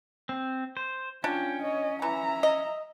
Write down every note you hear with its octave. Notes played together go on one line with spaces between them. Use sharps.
C4
C5
C#4 D4 F4 G5
C#5 D#5
E3 E5 A#5
D#5